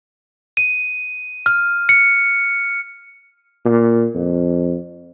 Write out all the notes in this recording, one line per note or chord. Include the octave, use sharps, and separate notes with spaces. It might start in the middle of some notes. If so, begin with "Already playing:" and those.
D#7
F6
C#7
A#2
F2